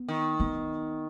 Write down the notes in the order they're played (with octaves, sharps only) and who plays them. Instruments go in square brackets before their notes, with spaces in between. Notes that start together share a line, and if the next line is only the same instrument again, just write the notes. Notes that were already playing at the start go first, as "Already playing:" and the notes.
Already playing: [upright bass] B3
[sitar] D#3
[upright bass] B3